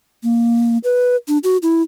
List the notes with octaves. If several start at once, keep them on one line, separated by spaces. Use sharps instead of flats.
A#3
B4
D4
F#4
E4